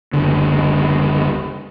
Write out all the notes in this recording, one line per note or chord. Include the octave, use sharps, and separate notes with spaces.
F#1 D2 D3